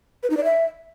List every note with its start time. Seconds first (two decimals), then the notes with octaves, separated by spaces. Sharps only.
0.23 B4
0.30 D#4
0.37 D5
0.44 E5